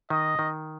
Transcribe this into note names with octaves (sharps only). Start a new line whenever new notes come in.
D#3 D#5
D#3